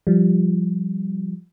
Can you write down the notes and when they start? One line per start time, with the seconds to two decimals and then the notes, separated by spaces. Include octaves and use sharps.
0.07 F3 G3